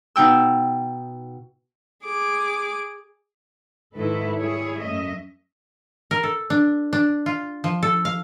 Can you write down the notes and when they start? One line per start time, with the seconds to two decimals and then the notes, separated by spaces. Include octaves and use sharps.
0.16 B2 D#4 G5 E6
2.05 G#4 D6
3.95 G#2 D#3 E4 A4 B4
4.35 G3 E4 G#4 C#5
4.79 F#2 A3 C#4 D#5 E5
6.11 A#4
6.23 A4
6.50 D4
6.93 D4
7.26 F4
7.64 F3
7.83 A4
8.05 F5